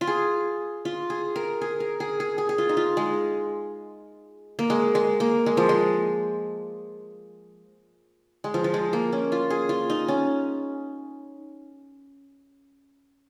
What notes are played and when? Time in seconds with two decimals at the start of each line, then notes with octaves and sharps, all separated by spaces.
0.01 F4
0.07 G#4
0.85 F4
1.10 G#4
1.36 A#4
1.61 G#4
1.80 A#4
2.00 G#4
2.20 G#4
2.38 G#4
2.49 G#4
2.58 F4
2.69 D#4
2.77 F4
2.97 G#3
4.59 A#3
4.70 G#3
4.95 G#3
5.20 A#3
5.46 G#3
5.57 F3
5.69 G#3
8.44 G#3
8.54 F3
8.64 F3
8.74 G#3
8.93 A#3
9.13 C#4
9.32 F4
9.50 G#4
9.69 F4
9.90 D#4
10.08 C#4